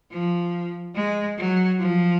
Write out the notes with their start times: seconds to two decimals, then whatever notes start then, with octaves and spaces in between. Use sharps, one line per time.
0.11 F3
0.95 G#3
1.38 F#3
1.80 F3